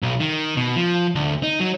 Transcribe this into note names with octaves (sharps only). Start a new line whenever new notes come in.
B1
D#3
B2
F3
D2
D#4
F#3